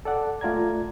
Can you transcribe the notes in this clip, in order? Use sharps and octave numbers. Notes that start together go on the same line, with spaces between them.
A4 D5 F#5
A3 F4 D5 A#5 G#6